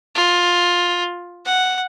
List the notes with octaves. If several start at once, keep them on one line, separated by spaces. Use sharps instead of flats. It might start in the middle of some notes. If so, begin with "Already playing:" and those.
F4
F#5